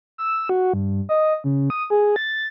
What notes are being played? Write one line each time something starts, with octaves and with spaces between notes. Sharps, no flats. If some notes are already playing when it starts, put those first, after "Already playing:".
E6
F#4
G2
D#5
C#3
D#6
G#4
A6